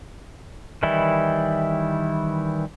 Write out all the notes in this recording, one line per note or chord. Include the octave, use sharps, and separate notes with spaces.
D#3 E3 G3 E4